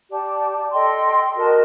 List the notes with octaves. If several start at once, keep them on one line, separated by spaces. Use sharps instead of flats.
G4 D5 A5
A4 D#5 G5 C6
F#4 A#4 D#5 A5